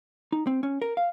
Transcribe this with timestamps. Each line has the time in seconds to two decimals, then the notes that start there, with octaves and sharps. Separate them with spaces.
0.32 D#4
0.47 C4
0.63 C#4
0.82 A#4
0.97 F5